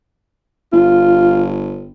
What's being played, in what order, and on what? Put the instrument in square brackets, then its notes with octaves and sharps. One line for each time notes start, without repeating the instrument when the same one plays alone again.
[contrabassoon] G1 [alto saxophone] F4